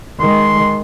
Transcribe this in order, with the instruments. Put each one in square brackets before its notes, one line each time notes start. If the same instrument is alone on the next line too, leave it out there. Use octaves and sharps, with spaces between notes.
[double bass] D#3 G#3 [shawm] C6